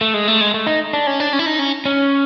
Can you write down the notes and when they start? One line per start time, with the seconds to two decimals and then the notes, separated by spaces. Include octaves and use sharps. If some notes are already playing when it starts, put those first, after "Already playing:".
0.01 A3
0.14 G#3
0.28 A3
0.41 G#3
0.54 A3
0.66 D#4
0.93 D4
1.07 C#4
1.20 D4
1.33 C#4
1.39 E4
1.46 D#4
1.59 C#4
1.85 C#4